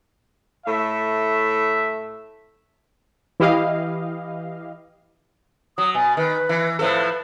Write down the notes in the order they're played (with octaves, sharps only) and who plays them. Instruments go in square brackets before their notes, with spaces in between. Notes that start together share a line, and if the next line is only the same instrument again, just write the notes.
[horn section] A2 A3 E5
[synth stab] E3 E4 G4 D#5 F5
[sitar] F#3 [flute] D#6
[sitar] B2 [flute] G#5
[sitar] D#3 [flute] B4
[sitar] E3
[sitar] A2 F3 A4 [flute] B4